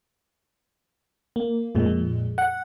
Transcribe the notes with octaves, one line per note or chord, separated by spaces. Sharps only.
A#3
F2 A#2 G#3
F#5